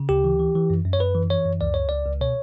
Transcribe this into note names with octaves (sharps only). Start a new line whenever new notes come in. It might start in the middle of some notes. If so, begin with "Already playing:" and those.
Already playing: C#3
D2 G4
E3
E3
E3
F#2
F#2
C#5
F#2 B4
E3
E3 C#5
F#2
C#2 D5
C#2 C#5
C#2 D5
C#2
B2 C#5